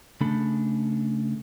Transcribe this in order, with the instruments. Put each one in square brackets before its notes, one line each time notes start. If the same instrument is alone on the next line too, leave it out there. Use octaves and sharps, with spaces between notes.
[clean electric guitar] C#3 A3 D4 A4 B5